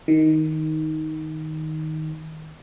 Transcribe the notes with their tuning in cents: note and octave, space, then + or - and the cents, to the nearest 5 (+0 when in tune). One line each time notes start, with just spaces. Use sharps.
D#3 +10